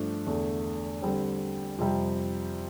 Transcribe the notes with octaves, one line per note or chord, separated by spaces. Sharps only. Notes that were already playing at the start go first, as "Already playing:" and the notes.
Already playing: G2 F3 A3 D4
E2 D3 A3
D3 G3 C4
F2 C3 G3